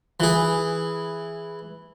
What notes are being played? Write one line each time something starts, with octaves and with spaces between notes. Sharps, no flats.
E3 G#4